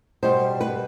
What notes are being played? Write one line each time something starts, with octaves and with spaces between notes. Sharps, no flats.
B2 G3 C5
B4